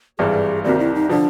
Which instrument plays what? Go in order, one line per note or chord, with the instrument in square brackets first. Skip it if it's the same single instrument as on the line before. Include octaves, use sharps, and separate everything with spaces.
[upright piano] G#1 G2 E3 G3 [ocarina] G#4
[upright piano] C2 C3 D#3 G3 [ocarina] F#4
[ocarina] E4
D#4
[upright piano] D3 F3 [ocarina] D4